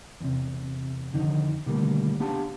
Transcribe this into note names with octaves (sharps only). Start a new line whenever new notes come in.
E2 C3
F2 D3 D#3 D#4
B2 D3 D#3 G3 A3 A#3
B3 D4 G4 F5 A5